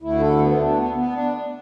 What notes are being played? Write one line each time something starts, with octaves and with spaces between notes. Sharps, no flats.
D2 D3 A3 E4
A4
B3
D4
B3
B3
D4